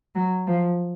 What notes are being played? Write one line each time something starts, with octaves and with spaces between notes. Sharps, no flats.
F#3
F3